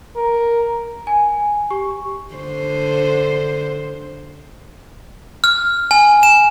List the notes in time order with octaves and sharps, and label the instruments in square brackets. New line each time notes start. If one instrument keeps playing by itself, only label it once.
[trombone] A#4
[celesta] G#5
G4 C#6
[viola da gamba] D3 C5
[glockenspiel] F6
G#5
E7